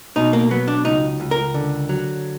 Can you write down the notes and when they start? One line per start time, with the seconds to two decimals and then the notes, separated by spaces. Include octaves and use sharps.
0.16 B2 D#4
0.33 A#3
0.51 F#3 B3
0.68 D4
0.85 C#2 D#4
1.20 C#2
1.31 A#4
1.54 D3
1.89 F#3